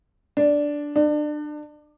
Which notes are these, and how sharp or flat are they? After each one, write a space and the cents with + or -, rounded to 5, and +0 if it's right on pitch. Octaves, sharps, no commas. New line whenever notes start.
D4 -5
D4 +30